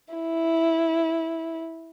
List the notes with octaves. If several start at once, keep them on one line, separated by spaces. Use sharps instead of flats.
E4